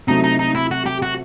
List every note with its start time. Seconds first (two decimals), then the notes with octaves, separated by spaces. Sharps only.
0.08 C3 F#3 A3 D#4
0.24 D#4
0.39 D#4
0.55 E4
0.71 F#4
0.86 G4
1.02 F#4